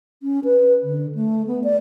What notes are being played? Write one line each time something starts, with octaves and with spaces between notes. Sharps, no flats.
C#4
B4
D3
A3
B3
D5